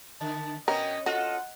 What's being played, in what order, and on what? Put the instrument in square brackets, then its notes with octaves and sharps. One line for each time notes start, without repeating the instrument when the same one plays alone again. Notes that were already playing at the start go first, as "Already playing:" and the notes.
[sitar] D3 [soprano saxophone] A5
[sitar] B2 B3 C#4 [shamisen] A#4 [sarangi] D#5 [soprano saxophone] G5
[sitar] F4 A4 [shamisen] F#4 [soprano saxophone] D#5 [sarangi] F#5